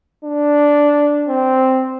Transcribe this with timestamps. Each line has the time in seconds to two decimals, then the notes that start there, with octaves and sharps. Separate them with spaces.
0.25 D4
1.29 C4